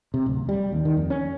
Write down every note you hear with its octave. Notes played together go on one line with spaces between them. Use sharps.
C3
D1
G3
D#2
D#3
F2
C#4